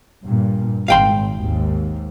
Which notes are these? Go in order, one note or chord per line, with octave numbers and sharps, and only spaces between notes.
G2 A#2
G#1 F5 G5 C6
D#2 G#2